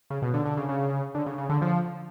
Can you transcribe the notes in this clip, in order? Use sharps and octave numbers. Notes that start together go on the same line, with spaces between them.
C#3
B2
D3
D3
C#3
C#3
D3
C#3
C#3
D3
F3